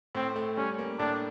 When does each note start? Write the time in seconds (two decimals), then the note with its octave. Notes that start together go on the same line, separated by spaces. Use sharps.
0.15 A2 C4
0.36 A3
0.57 G3 C#4
0.78 A#3
0.99 A2 D4